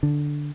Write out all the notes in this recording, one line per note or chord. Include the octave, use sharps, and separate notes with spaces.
D3